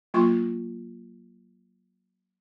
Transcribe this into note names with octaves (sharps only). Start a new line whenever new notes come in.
F#3 A#3 F4 C6 C#6